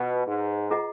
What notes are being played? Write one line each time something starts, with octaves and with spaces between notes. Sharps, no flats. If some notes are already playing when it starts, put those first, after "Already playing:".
Already playing: B2 F4 B4 D#5
G#2
F4 G#4 D#5 F#5 A#5